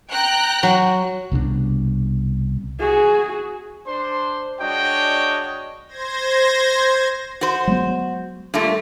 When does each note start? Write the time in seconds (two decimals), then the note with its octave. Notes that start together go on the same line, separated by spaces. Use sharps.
0.12 G5 A#5 F#6
0.63 F#3
1.32 C2 B2 F#3 D4
2.80 F#4 G#4
3.87 D4 C5 C6
4.61 G#3 D4 F#4 C#5 D#5 G5
5.88 C5 G#6 A#6
7.41 F#4 C5
7.67 F#3 G#3 B3
8.54 G2 A#2 A3